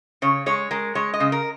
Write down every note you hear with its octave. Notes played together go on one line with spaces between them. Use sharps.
C#3 C#5
G#3 C#5
G#3 A#4
G#3 C#5
D#5
C#3
A#4